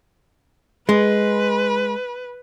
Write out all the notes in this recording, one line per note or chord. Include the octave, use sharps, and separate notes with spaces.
G#3 B4